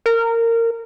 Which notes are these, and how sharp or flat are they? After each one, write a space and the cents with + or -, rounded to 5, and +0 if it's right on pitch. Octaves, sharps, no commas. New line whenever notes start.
A#4 -20